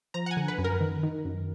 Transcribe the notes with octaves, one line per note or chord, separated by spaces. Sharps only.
F3 A#5
F#5
G#5
D3
B4
F#2
A#4
D#3
D#3
F#2